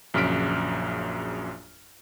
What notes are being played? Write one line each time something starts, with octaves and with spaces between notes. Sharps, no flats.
A#1 F#2 C#3 F6 B6 D7